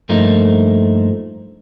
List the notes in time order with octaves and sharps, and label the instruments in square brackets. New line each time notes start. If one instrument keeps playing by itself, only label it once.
[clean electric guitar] G2 F3 A3 A#3 D#4